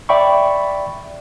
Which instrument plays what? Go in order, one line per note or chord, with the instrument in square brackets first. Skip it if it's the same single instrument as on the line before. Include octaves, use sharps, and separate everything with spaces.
[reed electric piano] D5 E5 G5 B5 C#6